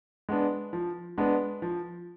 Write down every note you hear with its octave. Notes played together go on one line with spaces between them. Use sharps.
G#3 B3 D4
F3
G#3 B3 D4
F3